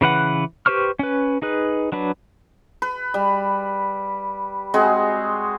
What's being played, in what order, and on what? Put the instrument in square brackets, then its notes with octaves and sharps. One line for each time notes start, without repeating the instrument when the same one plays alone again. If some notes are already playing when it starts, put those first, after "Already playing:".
[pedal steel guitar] C#3 E3 B4 F#5
G4 B4 C5 C#6 F6
C#4 B4
D#4 G#4 B4
F#3 D4 B4
[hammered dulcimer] B4
G3
G#3 C4 F#4 G#4